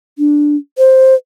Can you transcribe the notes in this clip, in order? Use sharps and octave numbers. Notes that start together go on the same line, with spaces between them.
D4
C5